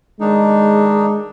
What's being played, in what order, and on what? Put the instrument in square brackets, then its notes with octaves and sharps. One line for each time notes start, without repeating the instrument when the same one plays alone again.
[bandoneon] D#3 D4 D#4 [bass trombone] G#3